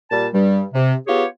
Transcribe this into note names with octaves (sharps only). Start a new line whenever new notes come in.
A#2 G3 A5
G2 G3
C3
B3 F4 G4 G#4 C#5